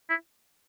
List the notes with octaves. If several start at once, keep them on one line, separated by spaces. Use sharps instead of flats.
E4